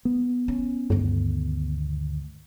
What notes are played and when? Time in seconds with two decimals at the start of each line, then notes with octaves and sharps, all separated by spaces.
0.05 B3
0.48 C#4
0.90 D2 G2 D#3